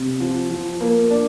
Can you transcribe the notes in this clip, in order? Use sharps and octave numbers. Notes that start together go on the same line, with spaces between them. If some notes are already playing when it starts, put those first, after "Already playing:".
Already playing: C3
F3
F3
A#3
D4